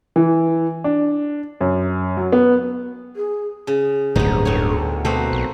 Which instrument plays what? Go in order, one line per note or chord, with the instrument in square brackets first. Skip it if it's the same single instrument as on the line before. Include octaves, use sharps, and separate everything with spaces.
[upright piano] E3
D4
F#2
F#3
B3
[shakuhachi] G#4
[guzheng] C#3 [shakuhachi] G#4
[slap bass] D1 G2 [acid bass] A#1 [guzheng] B3 D#4
[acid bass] D2 [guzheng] A2 C#5
[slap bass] B2 [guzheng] A3 A#3 C4
[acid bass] B1